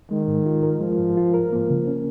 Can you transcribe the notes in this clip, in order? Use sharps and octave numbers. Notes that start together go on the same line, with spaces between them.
D#3 G#3
G#2
F4
A#4
F3 G#3
G#2
F4
A#4
F3 A#3
C#3
C#4